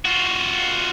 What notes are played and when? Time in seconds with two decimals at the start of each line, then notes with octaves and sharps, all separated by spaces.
0.05 F4 F#4